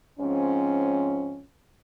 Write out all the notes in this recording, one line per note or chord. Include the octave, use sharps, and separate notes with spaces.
G#2 F3 C4 C#4